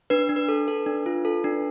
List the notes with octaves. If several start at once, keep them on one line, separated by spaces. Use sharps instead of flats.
D4 B4
D4
B4
A4
A4
D4
F4
A4
D4